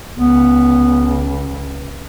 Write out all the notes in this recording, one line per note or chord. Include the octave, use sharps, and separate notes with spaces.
C#2 B3